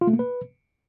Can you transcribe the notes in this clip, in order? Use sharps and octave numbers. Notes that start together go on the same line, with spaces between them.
F4
A3
A#3
B4